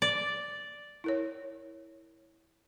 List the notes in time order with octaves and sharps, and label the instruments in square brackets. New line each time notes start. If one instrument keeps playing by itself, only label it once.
[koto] D5
[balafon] E4 A#4 C#5